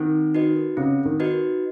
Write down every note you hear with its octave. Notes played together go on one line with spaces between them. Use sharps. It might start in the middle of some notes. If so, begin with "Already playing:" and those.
Already playing: D#3 C4
D#4 F#4 B4 D#5
C#3 C4
D#3
D#4 F#4 B4 D#5